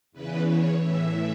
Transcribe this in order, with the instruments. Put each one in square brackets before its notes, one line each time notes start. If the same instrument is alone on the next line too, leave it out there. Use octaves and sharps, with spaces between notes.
[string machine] E2 C#3 E3 B4
C#5
A2 E3 E5